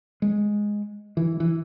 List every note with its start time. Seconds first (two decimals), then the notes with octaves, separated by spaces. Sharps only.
0.22 G#3
1.17 E3
1.40 E3